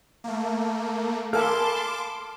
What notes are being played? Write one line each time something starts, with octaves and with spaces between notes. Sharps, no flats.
A3 A#3
A4 A#4 F5 G#5 A5 B5 C6 D6